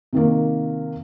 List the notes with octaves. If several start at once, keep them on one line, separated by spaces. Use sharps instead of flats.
C3 D#3 A#3